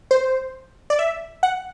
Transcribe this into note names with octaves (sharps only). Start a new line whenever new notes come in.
C5
D5
E5
F#5